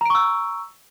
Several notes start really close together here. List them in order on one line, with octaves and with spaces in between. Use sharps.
A#5 D7 C#6 E6